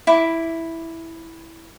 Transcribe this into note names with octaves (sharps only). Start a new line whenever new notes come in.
E4 D6